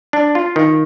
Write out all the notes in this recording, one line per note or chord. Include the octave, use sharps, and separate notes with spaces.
D4
F4
D#3